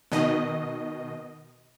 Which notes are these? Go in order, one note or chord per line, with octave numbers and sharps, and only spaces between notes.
B2 D#3 D#5